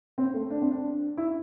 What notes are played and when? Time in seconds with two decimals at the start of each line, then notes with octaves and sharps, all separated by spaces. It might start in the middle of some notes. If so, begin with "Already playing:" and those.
0.18 C4
0.34 A3
0.50 D4
0.62 C4
0.71 D4
1.17 E4